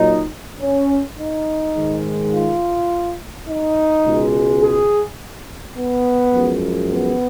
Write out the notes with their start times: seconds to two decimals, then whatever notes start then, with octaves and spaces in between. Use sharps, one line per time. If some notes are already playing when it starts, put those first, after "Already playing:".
Already playing: A#2 F#3 D#4
0.60 C#4
1.18 D#4
1.76 G#2 D#3 G#3
2.33 F4
3.48 D#4
4.05 C#2 B2 G#3
4.62 G#4
5.76 B3
6.34 F#2 F3 G#3
6.92 B3